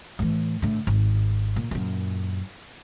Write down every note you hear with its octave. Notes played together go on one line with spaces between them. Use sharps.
A2 E3
A2 D3
G#1
A#2
F#2 A#2